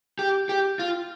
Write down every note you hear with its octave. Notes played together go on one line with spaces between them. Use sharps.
G4
G4
F4